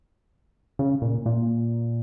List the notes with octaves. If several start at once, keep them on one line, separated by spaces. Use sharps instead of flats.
C#3
A#2
A#2